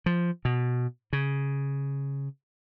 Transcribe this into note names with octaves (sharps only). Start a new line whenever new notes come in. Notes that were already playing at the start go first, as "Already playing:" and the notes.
F3
B2
C#3